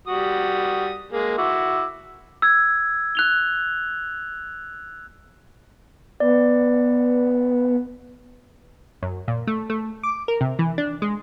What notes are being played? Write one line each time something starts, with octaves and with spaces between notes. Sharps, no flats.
G3 F#4 D#6
G#3 A#3 G#4
E4 F#4 D6
E6 G#6
F#6 F7 G7
B3 D5
F#2
A#2
A3
A3
D6
A#4
C3
E3
D4
G#3